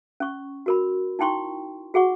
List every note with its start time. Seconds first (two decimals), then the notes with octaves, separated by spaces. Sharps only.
0.20 C#4 C#6
0.66 F#4 A#4 B5
1.19 D#4 E4 G5 C6 C#6
1.94 F#4 G#4 F#5 C#6